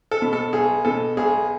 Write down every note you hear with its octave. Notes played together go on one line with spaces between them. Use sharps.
A4
B2
A4
B1 G#4
B2 A4
B1 G#4